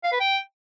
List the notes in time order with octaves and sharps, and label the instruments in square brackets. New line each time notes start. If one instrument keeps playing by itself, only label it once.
[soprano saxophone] F5
B4
G5